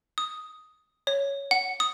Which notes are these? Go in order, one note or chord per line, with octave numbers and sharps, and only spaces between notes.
D#6
C#5
F#5
D#6